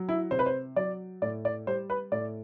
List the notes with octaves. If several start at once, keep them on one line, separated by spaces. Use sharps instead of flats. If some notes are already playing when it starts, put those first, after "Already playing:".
Already playing: F#3
E4
C3 C5
B4
C5
F#3 D5
A2 D5
D5
G3 C5
B4
A2 D5